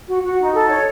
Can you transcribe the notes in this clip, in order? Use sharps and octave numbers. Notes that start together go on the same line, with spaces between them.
F#4
F#4
D#4
A4
C#5